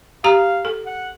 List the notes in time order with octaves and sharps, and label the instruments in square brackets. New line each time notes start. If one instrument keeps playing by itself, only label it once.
[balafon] G4 A#5 [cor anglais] F5
[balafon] A4
[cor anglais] F#5